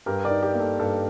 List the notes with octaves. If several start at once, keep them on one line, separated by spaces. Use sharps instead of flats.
G2 G4 A#4
A#4 D5
D#4
G4
A#3
A4
G2 A4